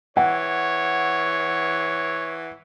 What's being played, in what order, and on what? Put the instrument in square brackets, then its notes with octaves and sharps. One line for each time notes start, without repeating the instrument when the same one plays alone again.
[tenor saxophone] E3 [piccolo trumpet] C#5 [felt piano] F#5